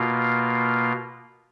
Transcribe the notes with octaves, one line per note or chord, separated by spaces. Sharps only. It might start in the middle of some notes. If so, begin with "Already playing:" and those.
Already playing: B2 A#3 F4